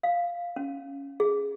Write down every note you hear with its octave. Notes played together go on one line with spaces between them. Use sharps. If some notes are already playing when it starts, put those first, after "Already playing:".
F5
C#4
G#4